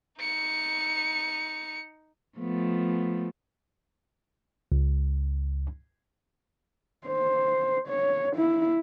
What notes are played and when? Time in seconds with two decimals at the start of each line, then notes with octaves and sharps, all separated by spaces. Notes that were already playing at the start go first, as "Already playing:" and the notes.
0.20 D#4 C#7
2.38 F3 A3 B3
4.72 C#2
7.07 C5
7.88 C#5
8.36 E4